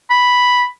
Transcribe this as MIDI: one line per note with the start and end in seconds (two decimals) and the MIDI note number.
0.10 0.67 83